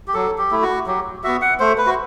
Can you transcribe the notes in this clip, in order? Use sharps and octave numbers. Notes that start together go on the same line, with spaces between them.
G4
F#3 A4
G4
A3 E4
F#4
F#3 G4
B3 F#4 E5
F#5
A3 C5
B4
F#4